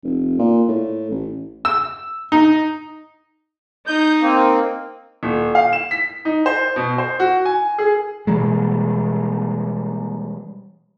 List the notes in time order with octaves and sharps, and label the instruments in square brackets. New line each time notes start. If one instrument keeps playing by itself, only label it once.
[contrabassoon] F1
A#2
A2
A1
[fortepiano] E6
D#4
[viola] D#4 [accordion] G6
[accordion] A#3 C4
[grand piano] D#1
F5
E7
B6
D#4
C5
B2
C5
F#4
G#5
G#4
[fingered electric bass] B2 E3 G3 G#3